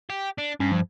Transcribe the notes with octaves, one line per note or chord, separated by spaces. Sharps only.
G4
D4
G2 C#4
F3